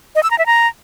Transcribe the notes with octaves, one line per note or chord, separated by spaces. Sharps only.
D#5
E6
A#5
E5
A#5